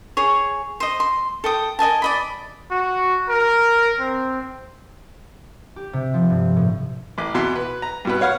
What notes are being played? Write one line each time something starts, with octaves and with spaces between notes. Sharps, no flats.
G#4 C#5
C5 D#5
C6
A4 G5 D#6
A#4 D#5 G#5 A5
D5 D#5 B5
F#4
A#4
C4
G4
C3
F3
G2
A2
A1 D6
E2 B2 E5 C6
B4
A#5
G2 B2 B4
C#5 F5 F#5 F6